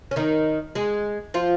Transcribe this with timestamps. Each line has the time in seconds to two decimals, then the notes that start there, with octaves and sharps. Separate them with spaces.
0.11 C#4
0.16 D#3 D#4
0.75 G#3 G#4
1.34 F3 F4